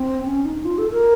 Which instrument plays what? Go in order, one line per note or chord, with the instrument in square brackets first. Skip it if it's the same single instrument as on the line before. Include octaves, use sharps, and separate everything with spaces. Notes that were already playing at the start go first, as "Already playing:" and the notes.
Already playing: [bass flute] C4
C#4
D#4
F4
A4
A#4